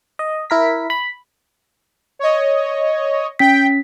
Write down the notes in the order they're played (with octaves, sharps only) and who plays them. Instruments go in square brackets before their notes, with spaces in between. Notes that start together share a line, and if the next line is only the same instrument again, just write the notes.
[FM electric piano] D#5
E4 A#4 B6
B5
[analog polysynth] C#5 D#5
[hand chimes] C#4 B6 [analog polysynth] G5